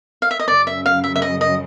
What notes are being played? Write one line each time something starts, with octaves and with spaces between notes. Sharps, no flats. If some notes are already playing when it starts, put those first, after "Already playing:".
F5
E5
D#5
F#2 C#3 F#3 D5
E5
F5
E5
E5
D#5
D#5